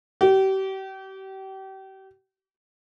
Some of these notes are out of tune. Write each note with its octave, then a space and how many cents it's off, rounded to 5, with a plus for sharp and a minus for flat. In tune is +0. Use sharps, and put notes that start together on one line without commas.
G4 -35